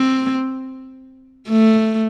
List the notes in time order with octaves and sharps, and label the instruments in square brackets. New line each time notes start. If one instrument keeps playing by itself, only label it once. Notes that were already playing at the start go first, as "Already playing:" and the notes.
Already playing: [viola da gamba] C4
A3